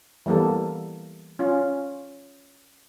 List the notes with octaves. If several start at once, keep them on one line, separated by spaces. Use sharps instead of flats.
E3 G3 A#3 B3 A4
C#4 F4